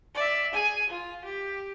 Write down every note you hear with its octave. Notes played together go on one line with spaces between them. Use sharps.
D5 E5
G#4 G#5
F4
G4